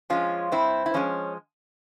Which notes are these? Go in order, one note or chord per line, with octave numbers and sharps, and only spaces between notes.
F3 G#3 C#4 F4
G2 C4 E4
E4
F3 G#3 C#4